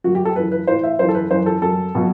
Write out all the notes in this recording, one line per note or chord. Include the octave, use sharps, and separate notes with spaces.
F#2 F#3 F#4
G4
A4
F#2 E3 B4
B4
A2 E3 C5
E5
F#2 E3 C5
A4
B4
F#2 E3 C5
A4
F#2 F#3 A4
B2 F#3